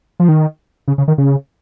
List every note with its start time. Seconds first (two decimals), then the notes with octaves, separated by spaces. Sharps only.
0.20 F3
0.29 D#3
0.88 C#3
0.98 C#3
1.08 D#3
1.18 C#3